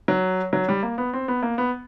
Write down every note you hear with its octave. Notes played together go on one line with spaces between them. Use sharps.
F#3
F#3
G3
A#3
B3
C4
B3
A#3
B3